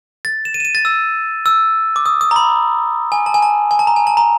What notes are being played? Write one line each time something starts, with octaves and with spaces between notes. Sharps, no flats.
A6
E7
D#7
E7
D#7
A6
E6
E6
D6
D#6
D#6
A#5
B5
G#5
A5
G#5
A5
G#5
A5
A#5
G#5
A5
A#5